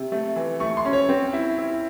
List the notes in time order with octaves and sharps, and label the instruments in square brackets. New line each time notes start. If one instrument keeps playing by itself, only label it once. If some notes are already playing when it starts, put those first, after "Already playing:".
Already playing: [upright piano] C3
A3
E3
[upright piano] A3 [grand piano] C#6
[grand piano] C6
[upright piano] C#4
[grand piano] C#5
[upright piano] C4
E4
E4